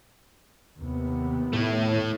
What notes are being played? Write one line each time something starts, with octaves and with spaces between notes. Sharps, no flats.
D#2 C3 B3
A2 A3 E4